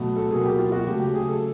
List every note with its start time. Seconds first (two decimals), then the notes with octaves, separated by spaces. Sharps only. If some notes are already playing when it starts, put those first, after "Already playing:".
Already playing: B2 F#3 A3
0.16 A4
0.30 B2 F#3 A#3 G#4
0.44 G4
0.59 F4
0.72 F#4
0.86 C#3 F#3 A3 G4
1.00 G4
1.14 G#4
1.29 A4